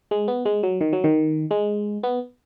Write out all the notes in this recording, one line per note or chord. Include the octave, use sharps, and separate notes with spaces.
G#3
B3
G#3
F#3
D#3
F#3
D#3
G#3
B3